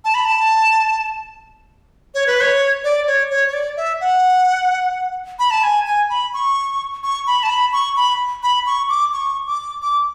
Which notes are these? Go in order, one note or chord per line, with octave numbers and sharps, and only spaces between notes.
A5
B5
A5
C#5
B4
C#5
D5
C#5
C#5
C#5
D5
E5
F#5
B5
A5
G#5
G#5
B5
C#6
C#6
B5
A5
B5
C#6
B5
B5
C#6
D6
C#6
D6
D6